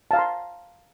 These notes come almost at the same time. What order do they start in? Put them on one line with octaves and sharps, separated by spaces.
A5 F5 A#5 C6